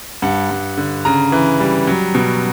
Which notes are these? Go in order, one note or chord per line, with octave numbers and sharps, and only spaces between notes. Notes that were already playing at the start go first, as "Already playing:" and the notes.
G2 F#5
G2
D3
C#3 A#5
E3
G3
F#3
B2